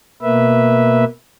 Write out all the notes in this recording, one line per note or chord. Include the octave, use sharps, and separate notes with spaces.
B2 A#3 B4 E5